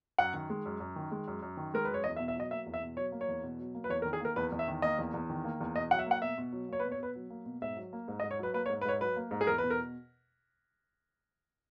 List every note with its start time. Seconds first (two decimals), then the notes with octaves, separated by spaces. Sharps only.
0.19 F#2 F#5
0.34 D#3
0.50 G#3
0.66 F#2
0.80 F#2
0.96 D#3
1.11 G#3
1.28 F#2
1.42 F#2
1.57 D#3
1.74 G#3 A#4
1.85 F#2 B4
1.94 C#5
2.04 E2 D#5
2.16 E5
2.20 B2
2.28 E5
2.36 F#3 D#5
2.51 A#3 E5
2.66 E2
2.74 E5
2.82 B2
2.97 F#3 C#5
3.12 A#3
3.21 C#5
3.28 E2
3.43 B2
3.59 F#3
3.75 A#3
3.84 B4
3.89 E2 C#5
4.02 A#4
4.05 D#3
4.13 G#4
4.21 A#3 A#4
4.36 E2 B4
4.52 E2
4.59 E5
4.68 D#3
4.82 A#3 D#5
4.99 E2
5.14 E2
5.30 D#3
5.44 A#3
5.61 E2
5.76 B2 D#5
5.91 F#3 F#5
5.99 E5
6.06 A#3 F#5
6.22 B2 E5
6.38 B2
6.53 F#3
6.69 A#3 C#5
6.80 B4
6.85 B2
6.92 C#5
7.00 B2 B4
7.15 F#3
7.30 A#3
7.45 B2
7.62 G#2 E5
7.77 F#3
7.93 A#3
8.08 G#2
8.20 D#5
8.23 G#2
8.31 C#5
8.39 F#3 B4
8.54 A#3 B4
8.66 C#5
8.69 G#2
8.81 B4
8.85 G#2 C#5
9.01 F#3 B4
9.16 A#3
9.31 G#2
9.41 G#4
9.47 E2 A#4
9.58 B2 B4
9.70 A#4